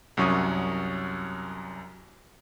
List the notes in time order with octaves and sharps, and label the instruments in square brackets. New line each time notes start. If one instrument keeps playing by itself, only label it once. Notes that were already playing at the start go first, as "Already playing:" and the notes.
[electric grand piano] C2 F#2 F#3 C#4 C#6 D#6